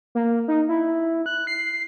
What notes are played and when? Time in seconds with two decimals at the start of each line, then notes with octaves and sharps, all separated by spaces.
0.15 A#3
0.48 D#4
0.69 E4
1.26 F#6
1.47 C7